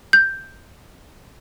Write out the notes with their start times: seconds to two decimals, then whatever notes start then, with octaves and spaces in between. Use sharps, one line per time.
0.13 G6